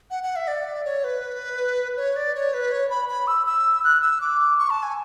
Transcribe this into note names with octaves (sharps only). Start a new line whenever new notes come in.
F#5
F#5
E5
D5
C#5
B4
C#5
D5
C#5
B4
C#5
B5
B5
E6
E6
F#6
E6
D6
C#6
A5
G#5